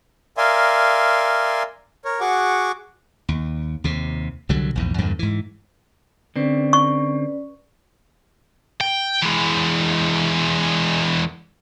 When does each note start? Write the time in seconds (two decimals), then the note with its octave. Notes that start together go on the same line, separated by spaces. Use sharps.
0.37 A#4 D5 E5 F5 G#5 C6
2.05 A#4 C#5
2.20 F#4 G#4 F#5 C#6 D6
3.29 D#2
3.84 D#2 C3
4.49 C2 D3 F#3 G3
4.75 A#1 E2 G#2
4.98 E2 G2 A#2 D3
5.19 G#2 E3
6.36 D3 C4 C#4 B4 D5
6.73 C#6
8.81 G5
9.22 E3 G#3